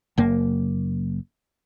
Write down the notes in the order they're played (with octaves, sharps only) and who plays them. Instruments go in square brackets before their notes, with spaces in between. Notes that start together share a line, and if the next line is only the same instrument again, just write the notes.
[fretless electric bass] F#1 F#2 A#3